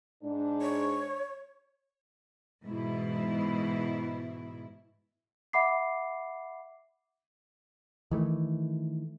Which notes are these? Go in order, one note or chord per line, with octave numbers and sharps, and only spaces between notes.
G#2 D4
C#5
G#2 B2 E3 E4
E5 F#5 B5 D6 C7
D#3 E3 A3